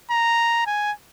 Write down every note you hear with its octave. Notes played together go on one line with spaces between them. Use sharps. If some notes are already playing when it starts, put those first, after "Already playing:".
A#5
G#5